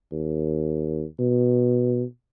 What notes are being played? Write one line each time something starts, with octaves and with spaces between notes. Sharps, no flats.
D#2
B2